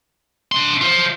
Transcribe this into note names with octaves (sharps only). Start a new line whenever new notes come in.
D4 C6
F4 C5